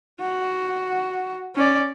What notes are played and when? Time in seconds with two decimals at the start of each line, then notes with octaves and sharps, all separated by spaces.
0.20 F#4
1.55 C#4 D5